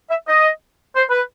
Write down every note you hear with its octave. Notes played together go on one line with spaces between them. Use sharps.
E5
D#5
C5
B4